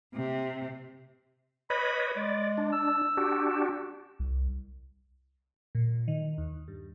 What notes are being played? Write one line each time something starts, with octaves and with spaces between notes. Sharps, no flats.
C3
B4 C#5 D#5 B5
G#3 D5
D4
E6
D4 F#4 G4
C2
A#2
D#3
D#2
G2